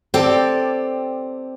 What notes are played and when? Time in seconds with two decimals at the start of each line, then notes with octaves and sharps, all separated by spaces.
0.14 C4 G4 A4 D5